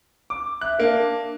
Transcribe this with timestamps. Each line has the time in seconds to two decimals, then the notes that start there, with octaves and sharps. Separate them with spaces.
0.30 D6
0.61 E5 F#6
0.80 A#3 D4